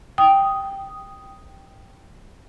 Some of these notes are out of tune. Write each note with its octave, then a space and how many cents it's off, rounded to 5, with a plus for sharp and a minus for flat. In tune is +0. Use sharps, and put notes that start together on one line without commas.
G5 +0 D#6 +0